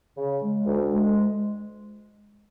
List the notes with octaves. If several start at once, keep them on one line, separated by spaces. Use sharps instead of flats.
C#3
G#3
D2
G#3